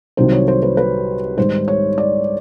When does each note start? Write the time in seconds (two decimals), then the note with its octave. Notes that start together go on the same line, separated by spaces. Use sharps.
0.17 C2 C3 D#3 F#3 C5
0.32 C#5
0.48 C5
0.63 B4
0.77 B4
1.37 G#2 D#3 G3 C5
1.68 C#5
1.98 D5